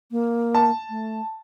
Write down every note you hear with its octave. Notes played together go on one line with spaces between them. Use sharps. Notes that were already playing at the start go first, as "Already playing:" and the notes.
A#3
A5
A3